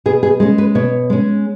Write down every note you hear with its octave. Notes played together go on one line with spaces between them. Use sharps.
B2 G#4
G#4
G#3 C#4 G#4
B4
B2 C#5
G#3 C#4